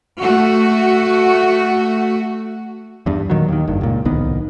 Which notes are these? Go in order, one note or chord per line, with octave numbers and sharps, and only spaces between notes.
A3 F#4
E2 G2
A#2 D#3 F#3
D#2 D#3
F#1 G2
C#2 A#2
D1 C2 D#3 B3